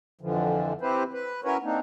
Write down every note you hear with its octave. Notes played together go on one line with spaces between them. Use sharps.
F2 D3 E3 F3
C4 E4 G4 B4 C5
B4
C#4 E4 F#4 A#4 B4 C#5
A#3 C4 D4 D#4